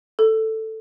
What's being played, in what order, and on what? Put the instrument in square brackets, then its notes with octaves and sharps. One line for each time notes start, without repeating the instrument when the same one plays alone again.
[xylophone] A4